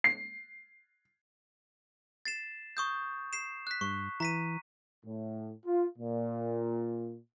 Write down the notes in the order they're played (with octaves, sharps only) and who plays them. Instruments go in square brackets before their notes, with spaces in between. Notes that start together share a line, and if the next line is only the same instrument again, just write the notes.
[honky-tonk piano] C7
[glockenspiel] A6 C7 E7
C#6 D#6 G6
C7 E7
F#6 B6
[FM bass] G2 [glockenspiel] C#6
[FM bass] E3 [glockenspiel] A#5 B6 D#7
[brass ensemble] A2
F4
A#2